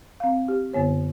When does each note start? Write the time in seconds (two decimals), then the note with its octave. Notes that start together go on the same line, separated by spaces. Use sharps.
0.20 C4 F5
0.48 G4
0.73 F#2 D3 B3 C#5